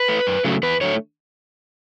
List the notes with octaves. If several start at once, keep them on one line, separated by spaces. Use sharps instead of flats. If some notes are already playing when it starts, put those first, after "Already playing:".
Already playing: B4
A3
F#2
C#3 F#3 A3
E2 B4
D3 F#3 A3 C#5